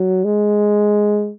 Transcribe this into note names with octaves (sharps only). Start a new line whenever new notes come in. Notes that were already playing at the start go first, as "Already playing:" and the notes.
Already playing: F#3
G#3